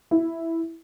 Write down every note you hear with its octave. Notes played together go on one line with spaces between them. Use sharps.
E4